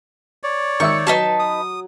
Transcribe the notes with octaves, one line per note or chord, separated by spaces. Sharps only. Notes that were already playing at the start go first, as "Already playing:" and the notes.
C#5 D5
D#3 E5 C#6 E6
F#3 D#4 B4 A5
D#6